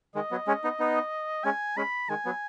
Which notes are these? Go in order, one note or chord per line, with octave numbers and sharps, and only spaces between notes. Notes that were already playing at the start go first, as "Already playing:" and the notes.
D#3 G#3 D#5
F#3 B3
G#3 C#4
B3 D#4
B3 D#4
G#3 C#4 G#5
G#3 C#4 B5
D#3 G#3 G#5
F#3 B3